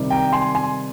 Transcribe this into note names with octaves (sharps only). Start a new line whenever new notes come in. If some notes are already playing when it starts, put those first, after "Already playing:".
Already playing: C3 D#3 G3
G5 A#5
G#5 C6
G#5 C6